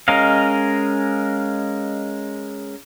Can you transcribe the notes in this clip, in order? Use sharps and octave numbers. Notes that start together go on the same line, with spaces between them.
G#3 C#4 A#4 D#5 F5